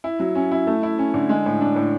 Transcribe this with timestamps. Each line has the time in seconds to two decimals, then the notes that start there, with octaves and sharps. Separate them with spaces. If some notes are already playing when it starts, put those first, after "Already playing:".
0.04 E4
0.20 F#3
0.35 C#4
0.52 E4
0.67 A3
0.83 E4
0.98 C#4
1.14 D3
1.29 G#3
1.46 A2
1.61 D4
1.76 A2